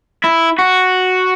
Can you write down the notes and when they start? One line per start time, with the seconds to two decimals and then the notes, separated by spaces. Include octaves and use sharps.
0.24 E4
0.58 F#4